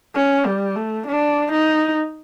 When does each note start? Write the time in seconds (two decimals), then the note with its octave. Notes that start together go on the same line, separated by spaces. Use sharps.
0.16 C#4
0.46 G3
0.76 A3
1.07 D4
1.52 D#4